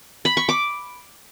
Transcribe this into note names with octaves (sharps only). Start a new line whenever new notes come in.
B5
C#6
D6